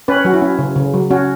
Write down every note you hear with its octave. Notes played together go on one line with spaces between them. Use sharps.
C#4 B4
C#5
F#3 F#4
E4
C#4
C#3
C#3
F#3
C#4 F#4